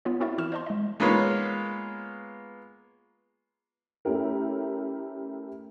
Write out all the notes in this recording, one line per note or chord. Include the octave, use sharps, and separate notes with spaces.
B3 F4 C#5
C4 E4 F#4 A#4 D5 E5
E3 E4 C#6 F6 E7
C5 D5 D#5 A5 C6
G#3 D#5
G#3 A#3 B3 F4 C#5
A3 C#4 E4 G4 A#4